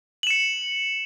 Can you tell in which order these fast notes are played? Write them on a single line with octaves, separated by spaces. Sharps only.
F#7 E7 C#7